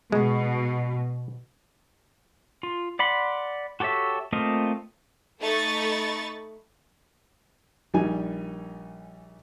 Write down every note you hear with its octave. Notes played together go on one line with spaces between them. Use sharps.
B2 G#3
F4
D5 F#5 B5 C6
F#4 G4 A4 C#5 E5
A3 A#3 C4 F4 D#5
A3 D#4 A4 B5 C#6 A6
A#1 G3 D#4 G#5